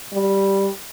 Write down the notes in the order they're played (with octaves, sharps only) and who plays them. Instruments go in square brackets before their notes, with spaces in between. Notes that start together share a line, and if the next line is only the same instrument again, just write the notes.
[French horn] G3